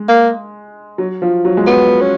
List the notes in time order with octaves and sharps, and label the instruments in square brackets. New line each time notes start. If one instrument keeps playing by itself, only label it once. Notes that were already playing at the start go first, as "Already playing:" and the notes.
Already playing: [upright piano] G#3
[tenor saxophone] A#3
[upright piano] F#3
F3
F#3
G#3
[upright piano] F#3 [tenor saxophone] B3
[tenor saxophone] C#4